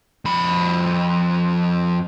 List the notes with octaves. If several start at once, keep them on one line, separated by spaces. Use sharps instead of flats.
F2 B5